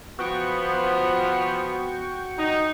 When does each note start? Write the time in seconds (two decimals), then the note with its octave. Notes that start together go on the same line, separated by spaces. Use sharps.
0.19 F3 B3 F#4 G5 C#6
2.38 D#4